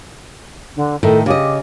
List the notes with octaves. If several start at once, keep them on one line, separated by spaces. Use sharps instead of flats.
D3
A2 D#3 A4
C#3 G4 D#5